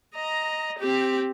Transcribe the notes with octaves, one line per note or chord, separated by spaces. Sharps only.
D#5 A#5
C4 G4